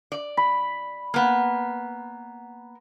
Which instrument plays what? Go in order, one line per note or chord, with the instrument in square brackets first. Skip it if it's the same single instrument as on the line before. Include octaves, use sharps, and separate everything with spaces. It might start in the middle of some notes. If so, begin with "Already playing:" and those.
[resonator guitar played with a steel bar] D5
[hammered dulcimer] B5
[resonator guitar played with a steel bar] A#3 B3